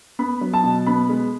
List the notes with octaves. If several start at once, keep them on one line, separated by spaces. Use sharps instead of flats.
B3 B5
F#3
A5
B2
B3 B5
G#3